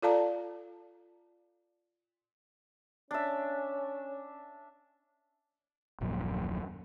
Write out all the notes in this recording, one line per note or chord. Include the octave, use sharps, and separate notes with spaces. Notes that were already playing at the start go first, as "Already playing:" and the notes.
F4 A4 D5 F5 A5 A#5
C#4 D4 E5
D#1 A#1 F#2 A#2